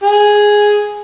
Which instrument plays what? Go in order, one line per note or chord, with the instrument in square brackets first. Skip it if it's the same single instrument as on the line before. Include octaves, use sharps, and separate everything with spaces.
[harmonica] G#4